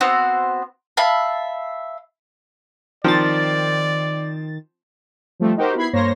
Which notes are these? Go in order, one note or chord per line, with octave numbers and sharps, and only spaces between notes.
B3 C4 F#4 C5
E5 F5 A5 B5
D#3 F3 C4 D5 A6
F3 G3 A3 C4
D#4 F#4 G4 A#4 C5
B3 E4 B5 G#6 C7
G2 A#3 C5 C#5 C6 A#6